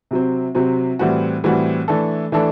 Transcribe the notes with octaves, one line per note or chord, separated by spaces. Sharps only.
C3 F#3 C4
C3 F#3 C4
A2 E3 G3 C4 F#4
A2 E3 G3 C4 F#4
E3 A3 D4 A4
E3 A3 D4 A4